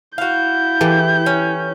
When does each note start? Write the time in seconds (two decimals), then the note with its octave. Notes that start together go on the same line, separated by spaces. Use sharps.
0.18 E4 F#4 F5 G6
0.81 E3 G4 A4
1.26 C#4